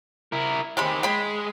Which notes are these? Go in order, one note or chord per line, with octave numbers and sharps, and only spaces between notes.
E4 A#4
C3 D#3 G#3 G4 B5
G#3 G5 B5